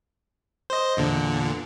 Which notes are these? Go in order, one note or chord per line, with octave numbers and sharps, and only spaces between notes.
C5 D#5
E2 A#2 D3